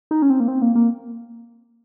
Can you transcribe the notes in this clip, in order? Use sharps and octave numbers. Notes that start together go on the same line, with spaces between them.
D#4
C#4
C4
A#3
C4
A#3
A#3